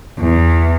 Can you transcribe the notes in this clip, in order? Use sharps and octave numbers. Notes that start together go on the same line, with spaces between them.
E2